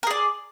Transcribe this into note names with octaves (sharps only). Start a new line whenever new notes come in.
G#4 A#4 D5